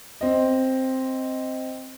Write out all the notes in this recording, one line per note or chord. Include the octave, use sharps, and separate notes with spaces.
C4 D#5